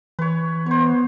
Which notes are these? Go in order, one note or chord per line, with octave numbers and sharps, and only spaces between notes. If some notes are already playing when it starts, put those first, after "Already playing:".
E3 B4 C#5
B3 C5 C#5